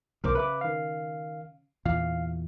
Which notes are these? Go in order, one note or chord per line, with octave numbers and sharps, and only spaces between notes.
B1 D#3 A#4 C5 D6
C#3 B4 E5 D6
D#3 F5
E2 A#2 F5